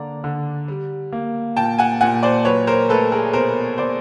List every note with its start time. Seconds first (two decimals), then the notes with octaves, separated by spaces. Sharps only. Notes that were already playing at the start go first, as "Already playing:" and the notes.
Already playing: D3 A#3 D5 A#5
0.24 D3
0.68 G3
1.13 A#3
1.57 A#2 G5 A5
1.78 F#5 G#5
2.01 A#2 F#5 G#5
2.23 C5 D5
2.45 F#3 B4 C#5
2.67 A#4 C5
2.89 A3 A4 B4
3.12 G#4 A#4
3.33 B2 A#4 C5
3.78 B2 C5 D5